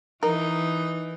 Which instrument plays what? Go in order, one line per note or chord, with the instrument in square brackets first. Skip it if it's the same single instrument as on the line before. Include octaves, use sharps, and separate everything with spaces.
[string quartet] E3 [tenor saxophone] D#4 [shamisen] A#4